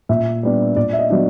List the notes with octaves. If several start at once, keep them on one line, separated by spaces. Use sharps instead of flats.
A#2 E5
G3 B3 D4
A#2 D5
E5
D#5
F#3 B3 D4